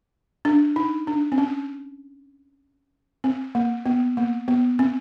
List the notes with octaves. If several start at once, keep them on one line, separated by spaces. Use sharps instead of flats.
D4
D#4
D4
C4
C#4
C4
A#3
B3
A#3
B3
C4